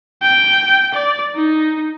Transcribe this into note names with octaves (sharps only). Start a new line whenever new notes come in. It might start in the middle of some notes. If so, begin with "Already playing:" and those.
G5
D5
D#4